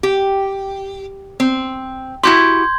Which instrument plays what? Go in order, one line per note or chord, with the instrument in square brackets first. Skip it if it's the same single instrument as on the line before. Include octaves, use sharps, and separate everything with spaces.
[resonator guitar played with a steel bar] G4
C4
[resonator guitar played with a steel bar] E4 F#4 G4 [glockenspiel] C6 G6 G#6